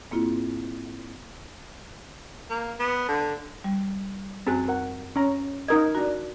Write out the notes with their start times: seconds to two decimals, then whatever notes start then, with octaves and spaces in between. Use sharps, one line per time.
0.11 G#2 A#3 C4 E4 F4
2.50 A#3
2.79 B3
3.08 D3
3.64 G3
4.47 F#2 C4 F#4 G#4 F#6
4.68 A#4 F#5
5.16 C#4 A#5
5.68 D#4 A#4 D#5 D#6 G#6
5.95 D4 F#4 A#5